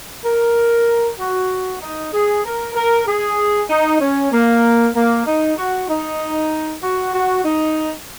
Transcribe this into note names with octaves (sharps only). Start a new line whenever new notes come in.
A#4
F#4
D#4
G#4
A#4
A#4
G#4
D#4
C#4
A#3
A#3
D#4
F#4
D#4
F#4
F#4
D#4